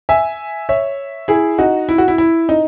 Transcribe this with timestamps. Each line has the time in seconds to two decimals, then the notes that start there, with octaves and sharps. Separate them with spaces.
0.09 E5 G#5
0.69 C#5 E5
1.28 E4 G#4
1.58 D#4 F#4
1.89 E4
1.98 F#4
2.08 E4
2.18 E4
2.49 D#4